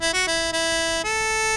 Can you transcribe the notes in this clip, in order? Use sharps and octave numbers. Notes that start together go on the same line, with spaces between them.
E4
F#4
E4
E4
A4